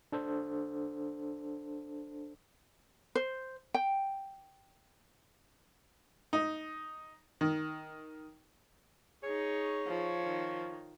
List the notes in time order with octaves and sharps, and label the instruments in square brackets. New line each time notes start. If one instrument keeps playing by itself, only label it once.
[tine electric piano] D4 A4 C5
[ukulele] C5
G5
[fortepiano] D#4
D#3
[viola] D#4 G#4 [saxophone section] C#5
[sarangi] F3
[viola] D#3